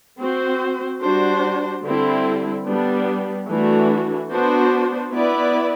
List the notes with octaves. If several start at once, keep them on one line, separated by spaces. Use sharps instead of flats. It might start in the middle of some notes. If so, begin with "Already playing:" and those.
C4 F#4 C5
G3 D4 F#4 C5
D3 G3 C4 E4
G3 B3 D4
E3 A3 D4 F#4
B3 D4 F#4 C5
B3 E4 B4 D5